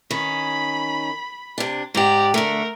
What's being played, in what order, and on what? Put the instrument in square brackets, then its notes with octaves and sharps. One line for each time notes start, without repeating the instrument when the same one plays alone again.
[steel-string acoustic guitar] D#3 C#4 [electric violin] B5
[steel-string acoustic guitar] C3 D4
[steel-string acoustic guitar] G#2 G4 [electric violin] D5 A#5
[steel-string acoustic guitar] D3 A3 [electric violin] A#4